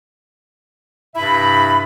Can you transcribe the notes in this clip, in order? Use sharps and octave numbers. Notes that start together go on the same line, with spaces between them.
G2 C3 E4 E5 B5